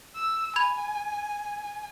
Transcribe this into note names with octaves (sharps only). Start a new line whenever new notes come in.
E6
G#5 B5 G#6 F7